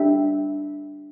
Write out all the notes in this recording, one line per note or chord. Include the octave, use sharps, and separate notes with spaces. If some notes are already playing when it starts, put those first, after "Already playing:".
Already playing: D4 G4 E5 G5